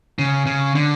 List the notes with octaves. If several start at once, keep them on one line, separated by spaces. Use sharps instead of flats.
C#3
C#3
D3